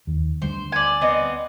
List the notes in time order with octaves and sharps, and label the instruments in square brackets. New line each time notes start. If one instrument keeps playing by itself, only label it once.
[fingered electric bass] D#2
[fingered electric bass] D2 G3 [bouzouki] C5
[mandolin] D5 G#5
[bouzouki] B3 C4 D#5